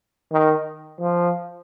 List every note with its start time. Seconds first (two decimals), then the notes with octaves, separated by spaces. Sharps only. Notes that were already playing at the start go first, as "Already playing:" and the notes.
0.32 D#3
1.00 F3